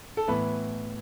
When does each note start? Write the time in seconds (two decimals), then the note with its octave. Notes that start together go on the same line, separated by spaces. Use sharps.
0.17 A4
0.28 A2 E3 B3 B4